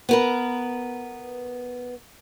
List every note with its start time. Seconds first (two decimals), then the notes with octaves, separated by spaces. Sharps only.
0.09 B3 A#4 B4